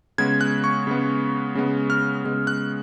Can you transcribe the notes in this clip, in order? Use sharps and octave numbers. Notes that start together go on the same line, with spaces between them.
C#3 G#3 B3 G#6
F#6
C#6
C#3 G#3 B3
C#3 G#3 B3
F6
C#3 G#3 B3
F#6